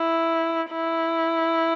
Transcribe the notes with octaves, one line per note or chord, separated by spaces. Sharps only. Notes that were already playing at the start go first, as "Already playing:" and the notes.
Already playing: E4
E4